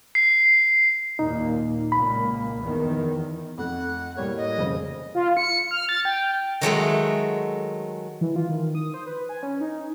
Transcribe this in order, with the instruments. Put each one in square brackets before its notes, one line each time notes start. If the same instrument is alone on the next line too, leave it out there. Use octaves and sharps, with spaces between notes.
[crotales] C7
[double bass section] D#2 A#2 A#3 [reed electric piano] D#4
[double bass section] C#2 A#2 A#3 [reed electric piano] B5
[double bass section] E2 D#3
[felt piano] F2 A3 [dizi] F#5
[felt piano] A2 G3 A#3 [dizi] C#5
[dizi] D#5
[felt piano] F1 C#3 C5
[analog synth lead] F4
C#7
F6
A6
G5
[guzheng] D#3 F#3 G#3 A3
[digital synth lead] E3
F4
D#3
D#6
C5
B4
G#5
C#4
D#4